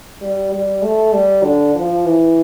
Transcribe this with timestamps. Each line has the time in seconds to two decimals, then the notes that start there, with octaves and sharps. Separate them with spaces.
0.21 G3
0.52 G3
0.83 A3
1.13 G3
1.43 D3
1.75 F3
2.06 E3